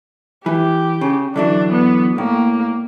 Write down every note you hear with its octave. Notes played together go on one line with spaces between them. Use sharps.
E3 G4
C#3
D3 E3 F#3 D4
B3
A2 A#3